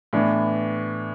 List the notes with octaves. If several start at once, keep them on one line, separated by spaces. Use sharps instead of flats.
A2 E3 B3 D4